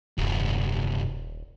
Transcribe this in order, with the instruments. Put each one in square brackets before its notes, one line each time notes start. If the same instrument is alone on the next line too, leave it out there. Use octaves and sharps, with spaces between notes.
[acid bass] D#1 [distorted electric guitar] C2 F#2